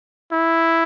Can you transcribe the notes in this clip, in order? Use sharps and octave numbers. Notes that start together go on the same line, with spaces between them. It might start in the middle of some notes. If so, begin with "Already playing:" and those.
E4